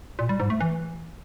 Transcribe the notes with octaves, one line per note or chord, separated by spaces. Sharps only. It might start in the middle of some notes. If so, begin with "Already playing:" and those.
A#2
G3
G#2
A3
E3